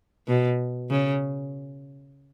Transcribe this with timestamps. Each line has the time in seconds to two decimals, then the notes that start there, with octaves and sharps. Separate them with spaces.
0.28 B2
0.90 C#3